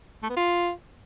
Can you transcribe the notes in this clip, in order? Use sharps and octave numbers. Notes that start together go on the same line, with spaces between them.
A3
B3
F4